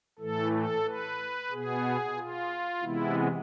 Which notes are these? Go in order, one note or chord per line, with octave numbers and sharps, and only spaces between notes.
A2 E3 A3 A4
A4
B4
B2 B3 G#4
F4
C3 E3 G#3 B3 E4